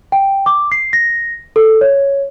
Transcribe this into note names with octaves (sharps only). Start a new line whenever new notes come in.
G5
D6
C7
A#6
A4
C#5